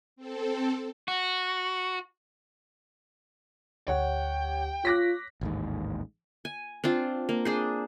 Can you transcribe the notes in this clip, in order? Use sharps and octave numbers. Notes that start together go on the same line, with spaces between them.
C4 A4
F#4
D2 G4 C#5 F#5 G5
F4 C#5 D6 F#6 A#6 B6
A1 D#2 G#2
G#5
C4 D4 F4
A#3
D4 G#4 C5